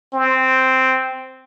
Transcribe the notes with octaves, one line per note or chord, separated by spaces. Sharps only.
C4